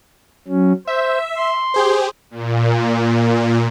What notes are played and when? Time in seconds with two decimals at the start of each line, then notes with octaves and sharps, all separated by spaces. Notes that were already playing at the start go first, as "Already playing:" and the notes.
0.48 F#3 C#4
0.87 C5 E5
1.37 C6
1.74 G4 G#4 C5
2.31 A#2